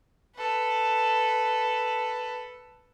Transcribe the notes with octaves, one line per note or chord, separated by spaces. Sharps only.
A4 B4